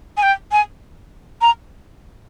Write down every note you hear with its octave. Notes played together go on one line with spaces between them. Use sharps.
G#5
G5
G#5
A#5